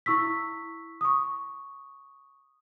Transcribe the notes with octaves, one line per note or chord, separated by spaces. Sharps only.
E4 C#6 E6 B6
C#6 D#6